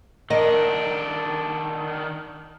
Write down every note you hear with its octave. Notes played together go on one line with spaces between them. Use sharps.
D#3 D4 A#4 D#5